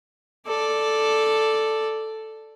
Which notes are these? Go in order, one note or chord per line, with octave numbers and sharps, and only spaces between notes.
A4 D5